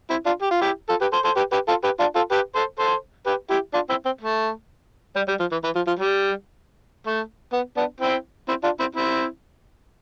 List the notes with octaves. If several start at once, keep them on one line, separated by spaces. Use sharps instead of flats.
C4 E4
D4 F4
G4
F4
E4 G4
F4 A4
G4 B4
A4 C5
A4 C5
G4 B4
G4 B4
F4 A4
G4 B4
D4 F4
F4 A4
G4 B4
A4 C5
A4 C5
G4 B4
E4 G4
D4 F4
C4 E4
C4
A3
G3
G3
F3
E3
E3
F3
F3
G3
A3
B3
B3 D4
C4 E4
C4 E4
D4 F4
C4 E4
C4 E4